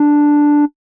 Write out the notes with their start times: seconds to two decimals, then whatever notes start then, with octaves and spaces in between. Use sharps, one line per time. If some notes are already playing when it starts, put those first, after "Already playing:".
Already playing: D4